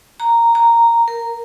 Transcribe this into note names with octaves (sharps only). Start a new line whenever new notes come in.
A#5
A#5
A#4